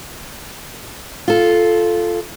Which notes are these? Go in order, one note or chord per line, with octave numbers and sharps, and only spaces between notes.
F4 A4